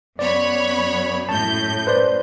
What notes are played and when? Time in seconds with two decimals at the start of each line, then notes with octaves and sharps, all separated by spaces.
0.19 F#2 B3 C#5 D5 B5
1.29 A2 A5 G6
1.87 B4 C5 D5